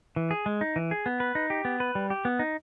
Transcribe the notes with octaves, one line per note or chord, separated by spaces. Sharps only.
E3
G#4
G#3
D#4
E3
G#4
B3
B4
D#4
G4
B3
B4
G3
G4
B3
D#4